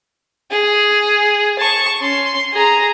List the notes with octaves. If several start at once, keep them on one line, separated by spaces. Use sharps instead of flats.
G#4
A5 C#6
C#4 C6
G#4 A#5